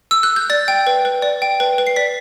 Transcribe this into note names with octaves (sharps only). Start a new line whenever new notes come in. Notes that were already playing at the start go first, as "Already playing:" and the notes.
E6
F#6
G6
D5 A6
G5
B4
B4
D5
G5
B4
B4
C7
D5 B6